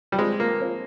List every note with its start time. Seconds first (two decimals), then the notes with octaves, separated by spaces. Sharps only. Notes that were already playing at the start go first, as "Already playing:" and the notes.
0.12 G3
0.18 F3 G#3 C4 F4
0.40 A#3
0.60 F3 C4 F4